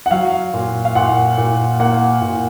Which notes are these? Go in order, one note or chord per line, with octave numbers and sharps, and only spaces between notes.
F#5
F#3 F5
A#2
F5
A#2 F#5
A#2
A#3 F#5
A#2